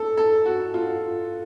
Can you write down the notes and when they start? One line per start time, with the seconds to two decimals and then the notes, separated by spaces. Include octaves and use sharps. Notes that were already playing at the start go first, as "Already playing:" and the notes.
Already playing: A4
0.17 A4
0.46 F#4
0.74 F4